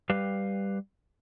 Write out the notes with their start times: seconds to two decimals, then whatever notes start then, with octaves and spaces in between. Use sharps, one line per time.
0.10 G3 G4 B4 F5